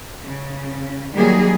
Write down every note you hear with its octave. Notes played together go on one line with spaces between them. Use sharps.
C#3
D#3 F#3 G3 A#3 G#4